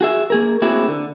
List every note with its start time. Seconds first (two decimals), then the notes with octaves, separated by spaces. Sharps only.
0.01 F#4 G#4 E5
0.30 A#3 G#4 A#4
0.62 A3 A#3 C4 E4 F#4 G#4
0.88 D3